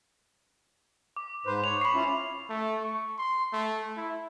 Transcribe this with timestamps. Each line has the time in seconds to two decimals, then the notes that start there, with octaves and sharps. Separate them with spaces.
1.17 D6
1.46 G#2 B4 C5
1.64 C#5 F7
1.81 B5 C#6 C7
1.94 C#4 E4 F4
2.49 A3
2.83 C#6
3.18 C6
3.53 A3
3.97 E4